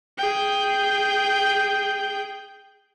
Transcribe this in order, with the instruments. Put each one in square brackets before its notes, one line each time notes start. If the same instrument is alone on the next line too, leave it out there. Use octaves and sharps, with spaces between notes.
[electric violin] G#4 G5